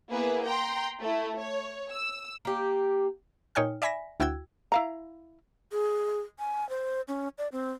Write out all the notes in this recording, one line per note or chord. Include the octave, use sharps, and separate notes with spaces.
A#3 B3 E4 G#4 B4
G5 A#5 C6
A3 E4
C#5
E6
A#3 G4
A#2 D#4 C#5 G5 G#5 F6
D5 E5 G#5 B5 A#6 B6
D2 E4 F#4 G5 E6 G#6
E4 F5 A#5
G#4
G#5
C5
C#4
D5
C4